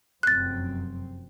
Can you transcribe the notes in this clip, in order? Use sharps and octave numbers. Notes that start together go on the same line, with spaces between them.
F1 F#2 C4 F#6 A6